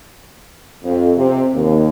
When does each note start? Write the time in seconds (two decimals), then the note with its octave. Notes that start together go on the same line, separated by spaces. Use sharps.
0.84 F2
1.16 C3
1.54 D#2